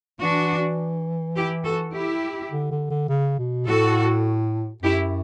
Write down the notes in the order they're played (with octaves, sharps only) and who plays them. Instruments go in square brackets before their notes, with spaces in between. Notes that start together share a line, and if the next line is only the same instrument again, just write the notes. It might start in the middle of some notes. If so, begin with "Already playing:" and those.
[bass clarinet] E3 [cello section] D4 F#4
[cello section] E4 G4
F#4 A4
E4 G4
[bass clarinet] D3
D3
D3
C#3
B2
[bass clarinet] A2 [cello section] F#4 A4
[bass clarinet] F#2 [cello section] E4 G4